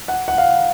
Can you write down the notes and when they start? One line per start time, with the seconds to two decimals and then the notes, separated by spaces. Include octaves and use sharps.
0.08 F#5
0.28 F#5
0.38 F5